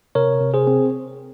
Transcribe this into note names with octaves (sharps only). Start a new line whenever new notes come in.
C3 A#4 C#5
C3
G#4 C5
C4